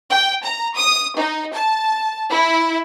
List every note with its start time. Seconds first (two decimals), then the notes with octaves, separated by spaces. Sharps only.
0.10 G5
0.43 A#5
0.75 D#6
1.16 D#4
1.53 A5
2.31 E4